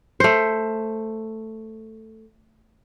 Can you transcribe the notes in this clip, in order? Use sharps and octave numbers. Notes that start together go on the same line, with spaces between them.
A3 C5